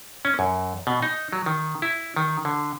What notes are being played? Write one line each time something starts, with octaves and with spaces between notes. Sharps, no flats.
C#4
F#2
B2
D#4
F#3
D#3
E4
D#3
D3